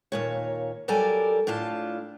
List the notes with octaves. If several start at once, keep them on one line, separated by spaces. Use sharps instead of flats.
D#2 A#2 C#5
F#3 G3 A4 A#4 D5 G#5
A2 D4 F4 A5